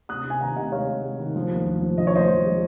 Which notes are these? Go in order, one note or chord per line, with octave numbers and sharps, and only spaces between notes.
C3 D#6 F#6
C3
G#5
D#3 F#5 A#5
C3 D#5 F#5
G#3 C#5 F5
C3
G#3
D#3
F3
D#2
F3
F3
F3 D#5
C#5
F3 C5 D#5
F3
G#3